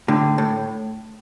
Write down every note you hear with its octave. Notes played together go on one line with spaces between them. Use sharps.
A2 D3
A2